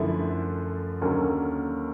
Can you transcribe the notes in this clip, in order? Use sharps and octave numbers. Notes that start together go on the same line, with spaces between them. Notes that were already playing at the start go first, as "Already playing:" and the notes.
Already playing: F#2 D3 F3 A3 E4
D#2 D3 F#3 A#3 C#4